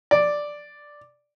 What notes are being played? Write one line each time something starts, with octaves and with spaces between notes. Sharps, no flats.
D5